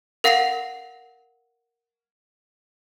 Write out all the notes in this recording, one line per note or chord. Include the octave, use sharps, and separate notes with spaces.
A#4 F5 F#5 A#6 C7 F7